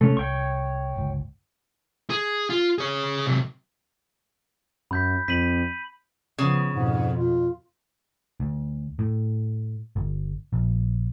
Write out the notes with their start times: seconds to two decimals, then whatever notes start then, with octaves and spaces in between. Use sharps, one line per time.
0.01 C3 G#3 A3 C#4 D4
0.17 C2 C#5 G5 C#6
0.96 G1 C#2
2.10 G#4
2.50 F4
2.78 G#4 C#5
3.27 C3 F#3
4.91 F#2 B5 G6 B6
5.28 F2 B6 D#7 F#7
6.39 C#3 F3 B3
6.74 F2 G#2 B2
7.18 F4
8.40 D2
8.99 A2
9.96 G1
10.53 A#1